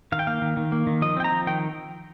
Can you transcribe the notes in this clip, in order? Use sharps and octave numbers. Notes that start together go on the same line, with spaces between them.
D#3 F5
G5
A#3 F5
D#3
D#3
A#3
D#3
F3 D#5
C4 G5
A#5
F3
D#3 G5